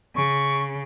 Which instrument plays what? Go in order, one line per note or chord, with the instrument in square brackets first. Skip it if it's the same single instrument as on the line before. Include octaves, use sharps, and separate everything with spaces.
[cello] C#3 [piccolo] C#6